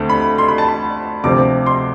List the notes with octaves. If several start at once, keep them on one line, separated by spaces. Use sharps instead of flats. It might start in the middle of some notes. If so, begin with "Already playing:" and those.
Already playing: D2 D3 A3 C4
B5
C6
B5
A5
B5
D2 C3 F3 C4 D6
C6